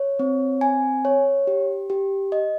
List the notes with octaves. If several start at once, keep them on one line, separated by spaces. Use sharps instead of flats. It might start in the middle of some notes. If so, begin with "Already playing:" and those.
Already playing: C#5
C4
G#5
C#5
G4
G4
D#5